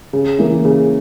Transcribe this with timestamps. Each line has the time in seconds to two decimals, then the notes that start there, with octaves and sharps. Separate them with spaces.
0.13 C#3
0.38 E3 A#3
0.64 C#3